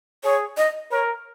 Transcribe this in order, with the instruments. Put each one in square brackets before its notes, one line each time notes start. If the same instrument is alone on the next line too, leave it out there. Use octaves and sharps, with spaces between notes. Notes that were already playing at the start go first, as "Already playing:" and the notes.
[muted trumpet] G#4 [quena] C#5
[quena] D#5
[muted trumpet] A#4 [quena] C#5